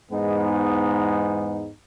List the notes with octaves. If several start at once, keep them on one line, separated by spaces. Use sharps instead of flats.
E2 G#2 G#3 B3 D#4